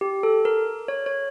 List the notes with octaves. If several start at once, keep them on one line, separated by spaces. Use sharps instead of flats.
G4
A4
A#4
C#5
C#5